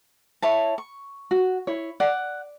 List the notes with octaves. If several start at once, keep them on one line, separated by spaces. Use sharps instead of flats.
E4 C#5 A5
C#6
F#4
E4 C#5
D5 F#5